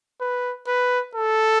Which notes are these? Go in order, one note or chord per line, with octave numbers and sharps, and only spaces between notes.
B4
B4
A4